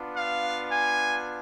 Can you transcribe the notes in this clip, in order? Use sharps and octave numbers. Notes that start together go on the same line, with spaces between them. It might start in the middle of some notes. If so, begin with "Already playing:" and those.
Already playing: B3 D4 F4
F5
G#5